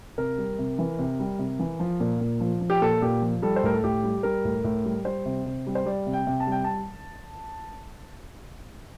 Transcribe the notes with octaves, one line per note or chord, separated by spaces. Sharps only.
C3 A#4
G3
C3
E3
C3
G3
C3
E3
F3
A#2
A#2
F3
F3
G4
A#2 A4
A#2 G4
F3
G3 A4
C5
A2 A#4
A4
A2 G4
G3
G3 A#4
A2
A2
G3
G3 C5
C3
C3
G3
C5
G3 D5
C3
G5
C3
A5
G3 G5
A5